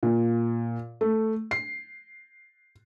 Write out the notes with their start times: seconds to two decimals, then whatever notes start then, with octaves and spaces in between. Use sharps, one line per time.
0.03 A#2
1.01 A3
1.51 C7